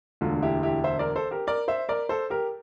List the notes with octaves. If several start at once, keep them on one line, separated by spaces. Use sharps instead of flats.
E1 D2 D3 F4
E4 G4
E4 G4
C5 E5
A#4 D5
A4 C5
G4 A#4
A#4 D5
C5 E5
A#4 D5
A4 C5
G4 A#4